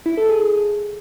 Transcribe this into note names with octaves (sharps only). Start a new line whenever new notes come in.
E4
A4
G#4